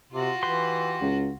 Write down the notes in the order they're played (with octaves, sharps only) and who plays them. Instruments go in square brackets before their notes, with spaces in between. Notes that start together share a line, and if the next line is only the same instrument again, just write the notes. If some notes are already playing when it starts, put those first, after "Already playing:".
[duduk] C3 [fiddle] F4 F#4
[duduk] E3 [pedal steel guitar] G4 B4 C6
[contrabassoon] C#2